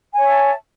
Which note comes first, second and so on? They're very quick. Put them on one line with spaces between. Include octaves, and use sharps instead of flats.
G#5 C#5 E5 A5